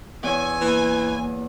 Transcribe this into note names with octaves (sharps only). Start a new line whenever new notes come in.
E2 C#5 G#5 E6
E3 A#3